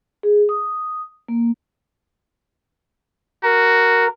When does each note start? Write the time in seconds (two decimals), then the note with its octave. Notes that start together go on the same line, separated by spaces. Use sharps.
0.23 G#4
0.49 D#6
1.28 A#3
3.43 F#4 A#4